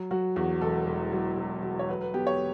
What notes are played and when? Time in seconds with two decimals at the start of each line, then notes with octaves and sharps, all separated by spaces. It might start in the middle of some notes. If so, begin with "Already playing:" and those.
Already playing: F#3
0.11 F#3 F#4
0.36 E2 F#4
0.61 E1 A4
0.87 E1
1.12 F#3
1.38 F#3
1.63 F#3
1.79 C#5
1.89 F#3 B4
2.01 B4
2.14 B3 G4
2.27 C#5